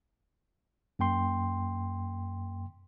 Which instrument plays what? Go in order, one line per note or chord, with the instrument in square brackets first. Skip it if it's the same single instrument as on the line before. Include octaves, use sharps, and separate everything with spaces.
[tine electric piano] F#2 A#3 G5 C6